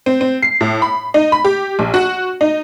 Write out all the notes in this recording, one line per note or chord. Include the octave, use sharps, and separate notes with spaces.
C4
C4
C7
A2
B5
D#4
B5
G4
A#1
F#4
D#4